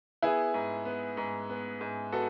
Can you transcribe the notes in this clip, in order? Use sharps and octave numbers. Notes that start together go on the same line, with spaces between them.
B3 E4 G#4
G#2
B3
G#2
B3
G#2
B3 F#4 A4